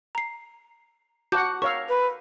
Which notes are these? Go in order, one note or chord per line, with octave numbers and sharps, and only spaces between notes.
A#5 C7
F#4 F#5 A5 D6 G6
A#4 C#5 F5 C#6 E6
B4